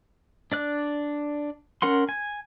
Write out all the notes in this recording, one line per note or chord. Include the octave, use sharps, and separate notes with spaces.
D4 D5 F#6
C#4 A#4 F#5 C6
G#5